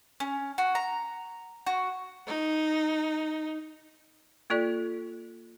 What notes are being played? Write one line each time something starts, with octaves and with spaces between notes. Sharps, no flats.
C#4
F#4
A#5
F#4
D#4
A#3 F4 A4 D5